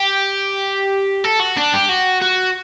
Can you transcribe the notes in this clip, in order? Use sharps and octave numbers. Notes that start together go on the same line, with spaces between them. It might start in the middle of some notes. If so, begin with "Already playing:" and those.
Already playing: G4
A4
F#4
D4
G4
F#4
F#4